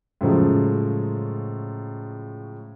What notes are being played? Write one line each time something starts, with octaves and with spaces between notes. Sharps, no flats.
A2 C#3 F3 F#3 G#3